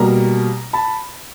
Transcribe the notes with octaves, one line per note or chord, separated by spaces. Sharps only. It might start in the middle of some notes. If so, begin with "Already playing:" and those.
Already playing: B2 G3 A#3 A#5
A5 B5